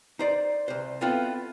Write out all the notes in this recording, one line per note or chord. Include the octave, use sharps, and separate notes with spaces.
D#4 C5 D5
C2 C5
B3 C4 E4 F4 A4